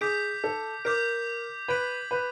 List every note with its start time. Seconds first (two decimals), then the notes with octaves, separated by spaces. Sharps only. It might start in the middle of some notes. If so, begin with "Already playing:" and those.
0.01 G#4 D6 G6 B6 D7
0.44 A4
0.85 A#4 D6 G6 B6 D7
1.68 B4 G#6 B6 D7 F#7
2.11 B4